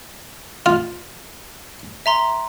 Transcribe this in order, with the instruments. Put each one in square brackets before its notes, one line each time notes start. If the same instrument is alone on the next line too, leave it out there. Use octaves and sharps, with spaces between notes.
[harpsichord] F4
[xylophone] E5 A#5 C6